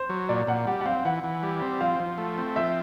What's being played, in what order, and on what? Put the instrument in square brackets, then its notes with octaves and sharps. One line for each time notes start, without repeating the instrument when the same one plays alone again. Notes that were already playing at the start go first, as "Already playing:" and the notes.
Already playing: [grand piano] C5
[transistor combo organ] F#3
[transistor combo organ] A#2 [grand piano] D5
[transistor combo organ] A#2 [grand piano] F#5
[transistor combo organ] G3 [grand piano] F#5
[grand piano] F#5
[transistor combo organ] C4 [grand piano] F5
[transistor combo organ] E3 [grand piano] F#5
[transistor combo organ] E3
G3
C4
[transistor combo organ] F3 [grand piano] F5
[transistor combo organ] F3
A3
C4
[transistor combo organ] F3 [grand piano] E5